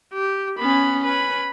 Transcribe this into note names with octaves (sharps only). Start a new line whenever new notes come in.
G4
B3 C#4 B5
C#4 B4 B5